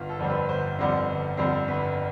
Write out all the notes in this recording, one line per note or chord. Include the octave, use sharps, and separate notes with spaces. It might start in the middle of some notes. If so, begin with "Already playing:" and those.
Already playing: G1 F4
A4
F2 D3 G3 C4
B4
G1 C5
F2 D3 G3 C4
G1
F2 D3 G3 C4
G1 B4